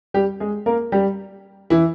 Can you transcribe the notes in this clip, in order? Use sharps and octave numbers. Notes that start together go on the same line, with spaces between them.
G3 G4
G#3 G#4
A#3 A#4
G3 G4
E3 E4